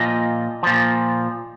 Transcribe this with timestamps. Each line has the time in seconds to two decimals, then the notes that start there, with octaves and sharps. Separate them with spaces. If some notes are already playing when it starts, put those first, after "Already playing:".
Already playing: A#2 F3 D#5
0.63 A#2 F3